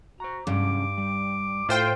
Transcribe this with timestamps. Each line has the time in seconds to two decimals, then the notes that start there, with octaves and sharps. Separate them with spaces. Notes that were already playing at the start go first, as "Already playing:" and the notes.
0.20 F#4 C5 A#5
0.47 G2 C3 F#3 C#4 D6
0.98 G3
1.69 A2 F4 C5 G5